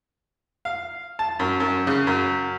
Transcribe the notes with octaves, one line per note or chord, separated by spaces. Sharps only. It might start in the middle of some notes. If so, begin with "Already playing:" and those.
F5
A5
F#2
F#2
C#3
F#2